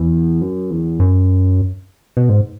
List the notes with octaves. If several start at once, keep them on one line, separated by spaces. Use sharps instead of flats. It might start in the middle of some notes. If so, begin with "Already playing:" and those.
Already playing: E2
F#2
E2
F#2
B2
G#2